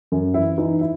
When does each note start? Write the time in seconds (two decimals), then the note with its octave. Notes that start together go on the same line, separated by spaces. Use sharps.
0.12 F#2
0.34 E3 E4
0.58 E3 D#4
0.81 E4